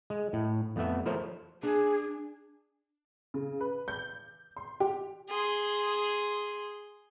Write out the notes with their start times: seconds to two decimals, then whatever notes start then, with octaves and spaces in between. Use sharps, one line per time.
0.10 G#3
0.33 A2
0.76 F2 A3 B3 E5
1.06 F3 A3 A#4 C5 C#5
1.63 D4 G#4
3.34 C#3
3.60 B4
3.88 G6
4.57 C6
4.80 G4
5.29 G#4 C6